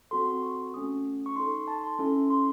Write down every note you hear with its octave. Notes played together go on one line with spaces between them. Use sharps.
C4 F#4 A4 C6
C#6
A3 C#4 F#4 A4 D#6
C#6
D#4 A4 C6
A5
C6
C#4 E4 A4
C6